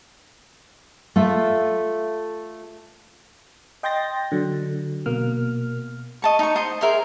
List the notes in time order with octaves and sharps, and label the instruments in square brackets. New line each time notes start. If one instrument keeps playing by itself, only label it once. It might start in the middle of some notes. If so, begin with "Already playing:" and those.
[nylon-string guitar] A3 F4 E5
[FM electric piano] D#5 G5 C6 G6 A6 A#6
D3 F#3
B2 A#3 F6
[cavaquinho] D#5 A5 C#6
D#4 C#6
C5 D#5 A5
G#4 A#4 E5 C6